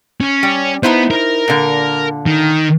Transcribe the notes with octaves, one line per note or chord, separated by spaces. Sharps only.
C#4
G3
B3 D#4 E4 C5
A#4
A#2 D3
D#3